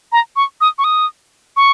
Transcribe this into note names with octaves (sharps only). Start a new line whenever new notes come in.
A#5
C#6
D#6
C#6
D#6
C#6